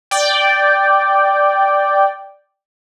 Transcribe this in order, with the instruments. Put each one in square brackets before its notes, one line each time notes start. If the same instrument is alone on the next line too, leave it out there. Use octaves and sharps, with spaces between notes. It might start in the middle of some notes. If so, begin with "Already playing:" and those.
[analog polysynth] D5 G5